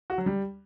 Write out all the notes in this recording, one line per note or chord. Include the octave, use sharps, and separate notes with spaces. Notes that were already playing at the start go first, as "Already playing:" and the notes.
F#4
F#3
G3